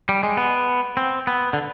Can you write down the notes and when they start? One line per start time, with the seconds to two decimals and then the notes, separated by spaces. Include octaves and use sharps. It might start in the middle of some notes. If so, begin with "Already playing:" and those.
0.09 G3
0.23 G#3
0.37 B3
0.97 C4
1.27 B3
1.53 D3